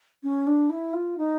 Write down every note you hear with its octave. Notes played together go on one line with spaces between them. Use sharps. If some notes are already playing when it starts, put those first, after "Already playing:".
C#4
D4
E4
F4
D#4